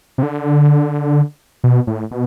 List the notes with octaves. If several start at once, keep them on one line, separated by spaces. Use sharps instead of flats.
C3
D3
B2
A2
B2